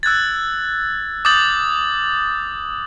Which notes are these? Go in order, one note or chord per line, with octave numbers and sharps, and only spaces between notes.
E6 F#6 G#6 A6
D6 D#6 G6 A6 F#7